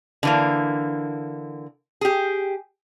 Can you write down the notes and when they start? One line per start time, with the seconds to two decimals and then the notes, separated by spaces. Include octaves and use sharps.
0.23 D3 E3 A#3
2.01 G4 G#4